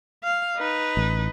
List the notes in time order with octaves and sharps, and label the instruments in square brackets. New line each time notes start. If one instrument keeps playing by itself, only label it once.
[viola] F5
D#4 B4
[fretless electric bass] A1